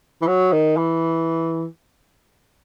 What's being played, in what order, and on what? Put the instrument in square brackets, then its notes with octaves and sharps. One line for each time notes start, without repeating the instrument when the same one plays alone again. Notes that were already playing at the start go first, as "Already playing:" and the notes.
[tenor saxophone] E3
F#3
D#3
E3